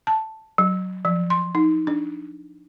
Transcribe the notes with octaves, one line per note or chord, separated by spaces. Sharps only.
A5
F#3
F3
C6
D#4
D4